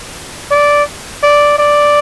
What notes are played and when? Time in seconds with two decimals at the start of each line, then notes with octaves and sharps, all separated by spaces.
0.51 D5
1.23 D5
1.59 D5